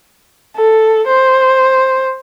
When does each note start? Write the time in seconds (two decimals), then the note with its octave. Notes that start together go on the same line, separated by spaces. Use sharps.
0.56 A4
1.07 C5